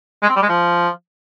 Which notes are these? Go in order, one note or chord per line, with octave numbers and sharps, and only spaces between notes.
G#3
C4
G3
G#3
F3